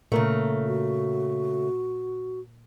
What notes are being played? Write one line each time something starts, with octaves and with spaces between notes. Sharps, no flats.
A#2 C#3 A3 A#4
F#4